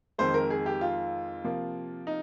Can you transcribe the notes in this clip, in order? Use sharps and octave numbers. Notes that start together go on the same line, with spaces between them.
F2 D#3 G#3 C5
A#4
G#4
G4
F4
C3 F3 A#3
D#4